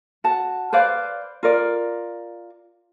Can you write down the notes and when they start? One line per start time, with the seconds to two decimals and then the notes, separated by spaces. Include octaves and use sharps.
0.24 F#4 F#5 A5
0.73 B4 C5 D5 F5
1.43 F4 A#4 D5